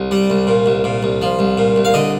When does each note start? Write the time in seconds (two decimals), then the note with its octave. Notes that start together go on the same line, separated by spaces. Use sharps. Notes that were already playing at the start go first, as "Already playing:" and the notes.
Already playing: C2
0.11 G3
0.30 C2
0.47 A#2
0.66 C2
0.84 A#2
1.03 C2
1.22 F3
1.39 C2
1.58 A#2
1.76 C2
1.85 F5
1.94 D3 D#5